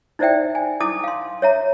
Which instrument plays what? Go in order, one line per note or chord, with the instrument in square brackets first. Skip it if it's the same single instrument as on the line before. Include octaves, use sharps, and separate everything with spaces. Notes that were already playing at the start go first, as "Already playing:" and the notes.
[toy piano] D#4 E4 C5 D5 E5 G5
G#5
E4 A5 D6 D#6
F5 C6
C#5 E5 A#5